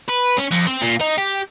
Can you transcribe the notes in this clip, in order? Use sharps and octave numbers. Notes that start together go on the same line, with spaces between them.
B4
C#4
F2
C4
A#2
D#4
G4